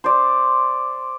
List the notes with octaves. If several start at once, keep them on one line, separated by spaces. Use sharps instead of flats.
C5 D5